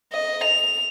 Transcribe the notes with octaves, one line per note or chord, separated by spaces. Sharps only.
D#5
F7